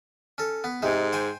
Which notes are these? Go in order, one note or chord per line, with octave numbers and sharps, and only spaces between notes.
C#4 A4
B3
G#2 C3 G#3 D#4
C5 G5 G#5